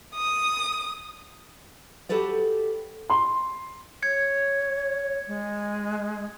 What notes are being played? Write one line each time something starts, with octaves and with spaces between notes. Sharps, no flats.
D#6
F#4 G4 A4 B4 D5
C6
C#5 G#6 C#7
G#3